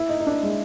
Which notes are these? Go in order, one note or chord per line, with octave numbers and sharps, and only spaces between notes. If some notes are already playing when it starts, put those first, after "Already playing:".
Already playing: E4
D#4
D#4
D4
G#3